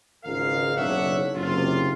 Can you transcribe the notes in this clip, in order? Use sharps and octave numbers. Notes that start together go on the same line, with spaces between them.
G#1 C#2 G#2 A#4 F5
F#1 B1 D4 C#5 E5 F#5
F#1 C3 F4